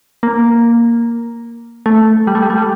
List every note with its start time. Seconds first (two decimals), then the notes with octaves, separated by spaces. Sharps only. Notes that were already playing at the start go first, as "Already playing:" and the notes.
0.23 A#3
1.86 A3
2.27 G3
2.35 A3
2.42 G3
2.50 A3
2.58 G3